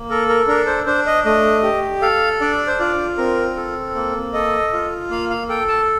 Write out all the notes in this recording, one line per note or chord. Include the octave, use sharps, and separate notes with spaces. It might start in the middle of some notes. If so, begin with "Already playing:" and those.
Already playing: A#3
A4 A#4
A#4
D4 A#4
C5
D4 C5
D#5
A3 D#5
G4
A4 F5
D4 D5
C5
F4 D5
C4 A#4
A4
A#3
A4 D#5
F4
A#3 F5
F5
A4 G5
A5